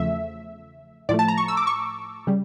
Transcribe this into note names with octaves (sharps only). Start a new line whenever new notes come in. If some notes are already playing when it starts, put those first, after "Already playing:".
Already playing: E2 C#3 F3 A3 E5
A2 F3 A3 D5
A5
A#5
C#6
E6
D6
C#6
C#3 G3